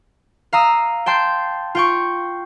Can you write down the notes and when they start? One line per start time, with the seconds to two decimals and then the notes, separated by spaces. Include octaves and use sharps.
0.53 F5 A#5 D#6 E6
1.06 G5 A5 C6 G6
1.75 F4 G5 C#6